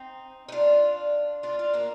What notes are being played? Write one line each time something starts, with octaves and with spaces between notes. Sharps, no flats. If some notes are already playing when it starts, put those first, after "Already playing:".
Already playing: C4 D#4
D#4
D4 F4
D4 F4
D4 F4
A#3 D4